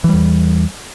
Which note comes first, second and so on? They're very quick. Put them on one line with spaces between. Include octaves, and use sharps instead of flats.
E3 G3 E2